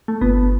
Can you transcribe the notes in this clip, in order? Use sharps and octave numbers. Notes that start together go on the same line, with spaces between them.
A3
G1 B3